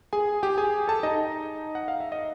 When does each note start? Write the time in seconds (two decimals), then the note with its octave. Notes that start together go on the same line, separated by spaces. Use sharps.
0.13 G#4 G#5
0.43 G4 G5
0.58 G#4 G#5
0.88 A4 A5
1.03 D#4 D#5
1.75 F#5
1.88 F5
2.00 E5
2.12 D#5